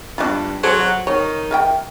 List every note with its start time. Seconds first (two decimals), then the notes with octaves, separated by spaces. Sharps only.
0.18 G2 D4 F4
0.63 F#3 G#4 A4 C5
0.80 F#4
1.07 D#3 C#5
1.51 A#4 E5 G5